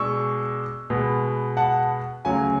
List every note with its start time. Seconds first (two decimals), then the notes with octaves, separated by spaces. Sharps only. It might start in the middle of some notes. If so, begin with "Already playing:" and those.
Already playing: B2 G#3 D4 C#6 E6
0.90 B2 G#3 B3
1.57 F#5 A5
2.25 D2 C#3 F#3 C#4 G#5